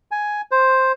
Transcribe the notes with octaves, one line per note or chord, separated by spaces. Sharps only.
G#5
C5